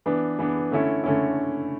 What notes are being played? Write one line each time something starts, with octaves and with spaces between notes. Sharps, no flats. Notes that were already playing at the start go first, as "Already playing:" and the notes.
E3 B3 D4
E3 B3 D4
D3 A3 C#4 E4
D3 A3 C#4 E4